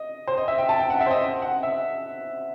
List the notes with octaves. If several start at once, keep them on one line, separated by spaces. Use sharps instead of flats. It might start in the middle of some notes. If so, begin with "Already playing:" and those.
Already playing: D#5
C5
D#5
E5
G5
A5
G5
F#5
E5
C5
D#5
F#5
E5